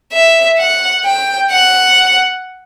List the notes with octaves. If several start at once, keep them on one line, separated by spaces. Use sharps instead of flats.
E5
F#5
G5
F#5